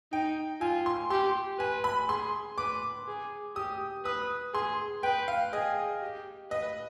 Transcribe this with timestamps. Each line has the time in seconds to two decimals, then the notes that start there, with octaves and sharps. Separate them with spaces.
0.12 D#4 G5
0.61 F4 G#5
0.86 C6
1.10 G4 C6
1.59 B4 G#5
1.84 B5
2.09 G#4 C6
2.58 B4 D6
3.08 G#4
3.56 G4 D#6
4.05 B4 D#6
4.54 G#4 C6
5.03 B4 G5
5.28 F5
5.53 G#4 D#5
6.02 G4
6.50 B4 D#5